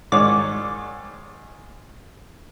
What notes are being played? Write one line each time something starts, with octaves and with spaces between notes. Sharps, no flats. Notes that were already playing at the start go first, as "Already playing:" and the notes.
G#2 D#3 C#5 D5